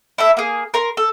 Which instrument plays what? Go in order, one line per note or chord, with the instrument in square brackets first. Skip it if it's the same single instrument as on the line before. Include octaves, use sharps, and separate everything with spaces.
[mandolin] E4 A4 E5
A#3 G#4
A#4 A#5 C6
A4